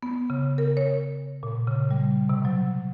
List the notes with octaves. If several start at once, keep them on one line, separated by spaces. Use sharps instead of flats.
B3
C#3
A#4
C#5
A#2
C#3
G3
C3
F#3